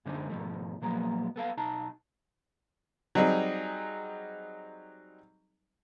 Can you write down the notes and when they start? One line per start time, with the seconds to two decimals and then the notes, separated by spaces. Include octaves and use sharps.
0.05 F#2 D3 G#3 C4 D4 D#4
0.30 G#2 B2 D#3 F3 A3
0.81 A#2 F3 F#3 G#3 A#3 B3
1.36 B3 A4 F5
1.57 B1 D#4 A5
3.15 F#3 G3 C4 D#4 G#4